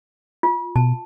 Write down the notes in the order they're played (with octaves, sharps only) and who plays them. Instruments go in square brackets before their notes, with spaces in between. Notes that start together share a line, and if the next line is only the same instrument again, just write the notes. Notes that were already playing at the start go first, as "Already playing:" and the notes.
[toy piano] F4
[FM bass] B2 [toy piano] A5